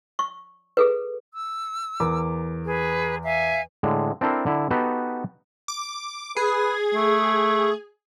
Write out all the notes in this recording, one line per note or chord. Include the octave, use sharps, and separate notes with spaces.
C#6
G#4 A4 B4
E6
E2 A#4 D6
G#4 B4
E5 F5 G#5
A2 D3 G#3
C4 D4 E4 A4 A#4 C5
D3 E4
B3 D#4 F#4 G4 A4 B4
D6
G#4 B4
A3